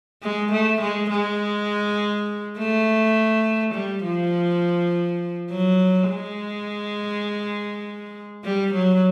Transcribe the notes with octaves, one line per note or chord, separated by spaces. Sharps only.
G#3
A3
G#3
G#3
A3
G3
F3
F#3
G#3
G3
F#3